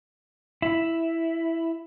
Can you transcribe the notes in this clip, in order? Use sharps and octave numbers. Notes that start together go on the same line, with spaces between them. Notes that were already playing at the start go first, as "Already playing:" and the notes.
E4